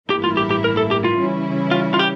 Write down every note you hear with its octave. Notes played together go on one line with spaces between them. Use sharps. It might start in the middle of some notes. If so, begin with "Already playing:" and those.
A1 G2 E3 A#3 E4 G4
F4
G4
G4
A#4
A4
G4
F4
C#3 E3 G3 C#4 E4
F4
F4
G4